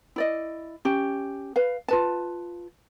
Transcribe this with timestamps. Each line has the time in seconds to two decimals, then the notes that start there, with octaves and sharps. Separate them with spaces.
0.16 E4 D5 D#5
0.85 C#4 G4
1.56 B4 F5
1.88 F4 B4 A5